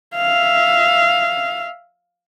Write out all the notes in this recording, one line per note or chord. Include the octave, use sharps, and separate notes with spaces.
E5 F5